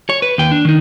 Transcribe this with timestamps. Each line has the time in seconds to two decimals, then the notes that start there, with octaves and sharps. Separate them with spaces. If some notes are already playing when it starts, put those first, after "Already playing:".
0.09 C#5
0.22 B4
0.38 D#2 G5
0.51 D4
0.65 D#3 D#4